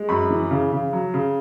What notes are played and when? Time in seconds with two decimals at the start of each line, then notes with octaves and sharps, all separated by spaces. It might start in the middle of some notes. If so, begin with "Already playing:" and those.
Already playing: G#3
0.09 F#2 B5
0.30 E3
0.51 C#3
0.72 C#3
0.93 F#3
1.14 C#3